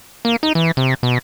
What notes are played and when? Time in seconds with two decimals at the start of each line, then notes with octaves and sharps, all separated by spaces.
0.25 A#3
0.43 D#4
0.55 E3
0.77 C3
1.03 B2